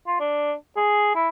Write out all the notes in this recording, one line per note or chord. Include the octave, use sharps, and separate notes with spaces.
F4
D4
G#4
E4